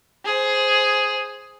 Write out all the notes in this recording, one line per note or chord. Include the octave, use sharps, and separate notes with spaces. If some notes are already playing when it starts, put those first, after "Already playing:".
G#4 C5